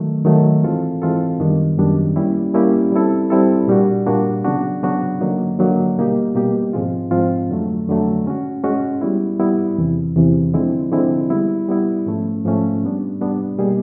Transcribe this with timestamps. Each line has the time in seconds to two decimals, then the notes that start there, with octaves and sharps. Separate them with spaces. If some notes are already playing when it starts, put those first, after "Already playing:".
Already playing: D#3 F#3 A3
0.25 D#3 F#3 A3
0.63 E3 G#3 C4 F4 A4
1.02 E3 G#3 C4 F4 A4
1.39 F#2 D#3 G3 B3 D4
1.78 F#2 D#3 G3 B3 D4
2.16 G3 A#3 C#4 E4 G4
2.54 G3 A#3 C#4 E4 G4
2.92 G3 C4 E4 A4
3.30 G3 C4 E4 A4
3.68 A#2 G3 A#3 D4 F#4
4.07 A#2 G3 A#3 D4 F#4
4.44 C#3 F#3 B3 D4 F#4
4.83 C#3 F#3 B3 D4 F#4
5.21 D3 F#3 A#3 D#4
5.59 D3 F#3 A#3 D#4
5.97 B2 G3 A#3 D#4 G4
6.35 B2 G3 A#3 D#4 G4
6.73 G#2 F3 G#3 C4 F4
7.11 G#2 F3 G#3 C4 F4
7.49 F2 D3 F#3 A3
7.87 F2 D3 F#3 A3
8.26 G#3 C#4 F#4
8.64 G#3 C#4 F#4
9.01 G3 B3 E4
9.39 G3 B3 E4
9.78 E2 C3 E3
10.16 E2 C3 E3
10.54 D3 F3 G#3 C4 E4
10.92 D3 F3 G#3 C4 E4
11.30 G3 B3 E4
11.69 G3 B3 E4
12.06 G#2 F3 A3 C#4
12.45 G#2 F3 A3 C#4
12.83 G3 B3 D4
13.21 G3 B3 D4
13.58 B2 G3 A#3 D#4 G#4